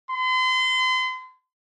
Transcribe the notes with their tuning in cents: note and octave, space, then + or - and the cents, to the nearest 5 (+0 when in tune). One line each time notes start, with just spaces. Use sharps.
C6 -40